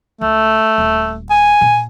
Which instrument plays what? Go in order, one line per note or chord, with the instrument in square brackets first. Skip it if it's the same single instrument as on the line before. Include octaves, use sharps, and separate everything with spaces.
[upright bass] C#2 [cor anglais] A3
[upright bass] D#1
[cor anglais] G#5
[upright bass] A#2